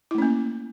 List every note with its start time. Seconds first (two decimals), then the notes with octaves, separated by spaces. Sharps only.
0.11 E4
0.15 A3
0.18 C#4
0.22 A#3